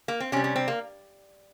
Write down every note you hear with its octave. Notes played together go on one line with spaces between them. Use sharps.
A#3
C4
C3 G3 C#4
C#4
C4
A#3